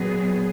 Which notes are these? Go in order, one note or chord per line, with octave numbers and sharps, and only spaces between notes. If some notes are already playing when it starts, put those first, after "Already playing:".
Already playing: A#2 F#3 B3 G#4